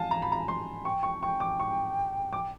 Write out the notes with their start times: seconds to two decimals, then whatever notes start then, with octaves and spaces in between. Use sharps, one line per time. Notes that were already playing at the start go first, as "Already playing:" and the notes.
Already playing: F5 G#5 A5
0.11 A#5
0.22 B5
0.32 A#5
0.48 C6
0.85 G5 C#6
1.03 C#6
1.22 G5 C#6
1.40 D6
1.60 C#6
2.33 D6